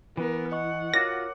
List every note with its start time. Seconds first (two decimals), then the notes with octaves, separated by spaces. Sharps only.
0.17 E3 B3 A#4
0.52 D#5 F#5 C#6
0.94 F4 F#4 A#4 C#5 D6 A#6